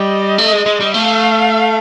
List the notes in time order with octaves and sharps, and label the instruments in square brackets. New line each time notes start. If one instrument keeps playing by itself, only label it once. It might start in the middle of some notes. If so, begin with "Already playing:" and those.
Already playing: [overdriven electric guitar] G3 [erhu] D#5
[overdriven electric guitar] A3
G#3
G#3
G3
[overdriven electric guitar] A3 [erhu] F5